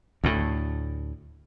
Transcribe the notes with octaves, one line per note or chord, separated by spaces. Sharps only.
D2 A2